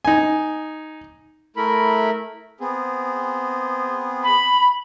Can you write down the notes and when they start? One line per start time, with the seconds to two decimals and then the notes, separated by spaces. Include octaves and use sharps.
0.05 D#4 G#5
1.56 A3 E4 A#4 B5
2.60 B3 C4 G#4
4.23 B5